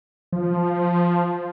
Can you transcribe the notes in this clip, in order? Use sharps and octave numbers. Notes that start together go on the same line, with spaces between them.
F3